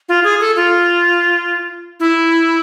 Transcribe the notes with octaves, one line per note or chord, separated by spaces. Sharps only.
F4
G#4
A4
F4
E4